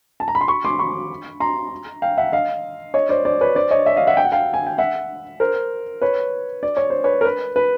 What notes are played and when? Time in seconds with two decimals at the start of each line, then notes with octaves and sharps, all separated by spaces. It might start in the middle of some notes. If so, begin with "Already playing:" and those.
0.20 A5
0.28 A#5
0.35 B5
0.41 C6
0.48 B5 C#6
0.65 C6 D6
0.79 B5 C#6
1.40 A#5 C6
2.02 F5 G5
2.18 E5 F#5
2.32 D#5 F5
2.94 C#5 D#5
3.09 C5 D5
3.25 C5 D5
3.41 B4 C#5
3.55 C5 D5
3.71 C#5 D#5
3.86 D5 E5
3.96 D#5 F5
4.07 E5 F#5
4.17 G5
4.24 F#5
4.32 F5 G5
4.54 G#5
4.67 G5
4.78 E5 F#5
5.40 A#4 C5
6.01 B4 C#5
6.63 D5
6.77 C#5
6.90 C5
7.04 B4 C#5
7.21 A#4
7.25 B4
7.56 B4